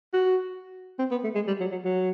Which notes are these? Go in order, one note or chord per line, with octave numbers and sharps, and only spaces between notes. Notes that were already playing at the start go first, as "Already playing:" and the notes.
F#4
C4
B3
A3
G#3
G3
F#3
F#3
F#3